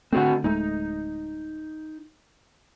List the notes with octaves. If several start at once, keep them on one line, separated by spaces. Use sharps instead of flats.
D3 A3 C4 F#4 F#5
D1 G#3 A3 D#4